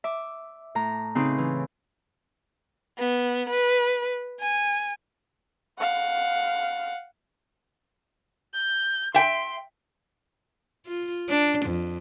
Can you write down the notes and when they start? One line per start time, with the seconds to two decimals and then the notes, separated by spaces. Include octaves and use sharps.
0.04 E5 D6
0.75 A2 A#5
1.15 C#3 C4 D#4 B4
1.38 E3
2.98 B3
3.49 B4
4.40 G#5
5.78 F5 F#5
8.54 G6
9.14 E5 G5 C6
10.86 F4
11.29 D4
11.65 F2